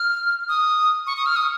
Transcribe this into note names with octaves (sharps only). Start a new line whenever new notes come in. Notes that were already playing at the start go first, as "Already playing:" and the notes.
Already playing: F6
D#6
C#6
D#6
F6
D#6